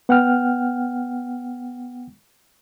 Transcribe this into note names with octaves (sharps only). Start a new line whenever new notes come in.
B3 F#5 G5 F6